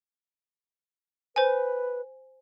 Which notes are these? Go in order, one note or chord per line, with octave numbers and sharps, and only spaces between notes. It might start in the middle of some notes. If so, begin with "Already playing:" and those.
B4 C5 G#5